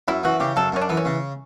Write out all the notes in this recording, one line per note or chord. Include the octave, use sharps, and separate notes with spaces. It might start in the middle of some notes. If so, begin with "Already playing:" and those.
F#2 E4
E3 F#4
C#3 G4
F#2 A4
F#2 C#4
D4
E3 B3
C#4
C#3